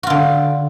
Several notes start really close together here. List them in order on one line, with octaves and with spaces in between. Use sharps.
F#4 F4 D3